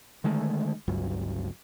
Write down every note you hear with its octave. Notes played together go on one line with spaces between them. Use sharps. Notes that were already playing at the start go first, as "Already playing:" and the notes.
D3 D#3 G#3 A3
G1 C#2 G2 F#3